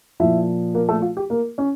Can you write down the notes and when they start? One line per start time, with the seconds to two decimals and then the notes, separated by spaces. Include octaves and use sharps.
0.20 A#2 F3 E4 E5
0.75 A#3 A#4
0.89 A3 A4
1.02 F4
1.17 G4
1.30 A#3 A#4
1.58 C#4 C#5